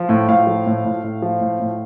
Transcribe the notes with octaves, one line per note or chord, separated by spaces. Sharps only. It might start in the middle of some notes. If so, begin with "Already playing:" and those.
Already playing: F3
A2
A2 F5
F3
A2
A2
A2
F3
A2
A2